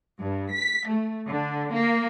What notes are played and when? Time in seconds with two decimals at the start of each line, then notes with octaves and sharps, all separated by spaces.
0.20 G2
0.52 B6
0.88 A3
1.28 D3
1.73 A#3